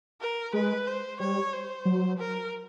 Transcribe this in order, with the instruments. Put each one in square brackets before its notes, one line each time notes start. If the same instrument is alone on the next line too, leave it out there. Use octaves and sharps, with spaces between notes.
[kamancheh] A#4
[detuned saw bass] G#3 [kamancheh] B4
[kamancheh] C5
[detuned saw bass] G3 [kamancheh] C#5
[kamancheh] C5
[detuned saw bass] F#3
[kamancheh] A#4